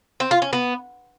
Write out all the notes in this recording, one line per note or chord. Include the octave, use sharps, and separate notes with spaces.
C4
F4
C#4
B3